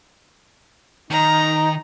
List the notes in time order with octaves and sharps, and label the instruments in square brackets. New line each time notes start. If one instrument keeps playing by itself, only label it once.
[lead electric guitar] D#3 [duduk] D#4 [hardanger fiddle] A#5